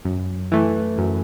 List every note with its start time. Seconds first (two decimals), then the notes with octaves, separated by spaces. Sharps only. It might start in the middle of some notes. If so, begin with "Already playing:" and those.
0.05 F#2
0.52 E3 A3
0.98 F#2